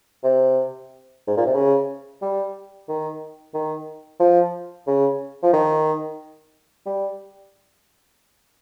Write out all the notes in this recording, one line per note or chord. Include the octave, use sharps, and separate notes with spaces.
C3
G#2
A#2
C3
C#3
G3
D#3
D#3
F3
C#3
F3
D#3
G3